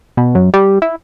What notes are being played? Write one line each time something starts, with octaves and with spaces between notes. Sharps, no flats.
B2
F#2
G3
E4